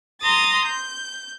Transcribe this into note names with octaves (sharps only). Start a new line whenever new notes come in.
A#5 C6 D#6 A6
G6